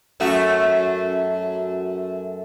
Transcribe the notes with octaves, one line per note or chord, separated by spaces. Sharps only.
F#2 A3 F#4